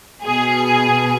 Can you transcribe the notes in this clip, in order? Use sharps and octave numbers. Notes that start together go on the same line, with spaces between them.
B2 G#4